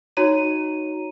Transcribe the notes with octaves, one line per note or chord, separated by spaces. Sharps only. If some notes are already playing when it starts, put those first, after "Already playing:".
D#4 F#4 C#5 A#5 D#7